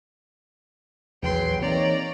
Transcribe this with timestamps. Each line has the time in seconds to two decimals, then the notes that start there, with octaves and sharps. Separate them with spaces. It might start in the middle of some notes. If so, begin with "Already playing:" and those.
1.22 A#1 E2 F#3 G#4 B4 G5 C6
1.61 E3 A#3 C4 D#4 C#5 D5 A#5